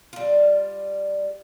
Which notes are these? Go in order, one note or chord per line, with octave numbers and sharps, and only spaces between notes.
G3 F4